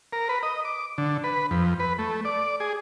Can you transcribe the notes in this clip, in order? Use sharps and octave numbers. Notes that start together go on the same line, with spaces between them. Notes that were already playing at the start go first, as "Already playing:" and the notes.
A#4
B4
D#5
D6
D3
B4
F2
B4
A3
D5
G#4